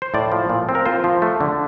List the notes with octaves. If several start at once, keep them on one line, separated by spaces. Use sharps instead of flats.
C5
A2 D5
F3
A#2
C4
A#4
F4 C5
F3
A3
D3